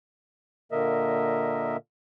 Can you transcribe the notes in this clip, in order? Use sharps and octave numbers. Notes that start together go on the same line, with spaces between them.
A#2 D3 A#3 A#4 D#5 E5